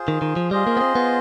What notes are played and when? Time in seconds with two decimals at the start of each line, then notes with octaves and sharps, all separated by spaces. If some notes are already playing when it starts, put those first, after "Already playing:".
Already playing: F4 G#4 C5
0.08 D#3
0.22 D#3
0.36 F3
0.51 G3 F4 G#4 C5 D#5
0.67 A#3
0.77 B3
0.81 C4
0.95 B3